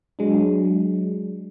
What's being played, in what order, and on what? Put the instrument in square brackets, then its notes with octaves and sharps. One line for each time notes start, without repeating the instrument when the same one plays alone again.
[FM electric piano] F#3 G#3 D4